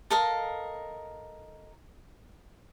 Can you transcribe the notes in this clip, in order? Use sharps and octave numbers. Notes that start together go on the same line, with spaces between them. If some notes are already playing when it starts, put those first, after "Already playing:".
A4 A#4 D#5 F5